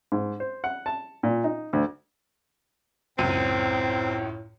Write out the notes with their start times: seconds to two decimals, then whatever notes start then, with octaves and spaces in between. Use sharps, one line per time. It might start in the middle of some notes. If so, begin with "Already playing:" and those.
0.12 G#2
0.40 C5
0.64 F#5
0.86 A5
1.23 A#2
1.44 D#4
1.73 D2
3.19 C#2 F#2 A2 C4 D#7